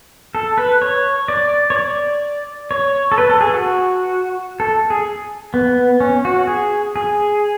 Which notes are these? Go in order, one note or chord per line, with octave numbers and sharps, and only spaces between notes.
A4
B4
C#5
D5
C#5
D5
C#5
A4
B4
A4
G#4
F#4
A4
G#4
B3
C#4
F#4
G#4
G#4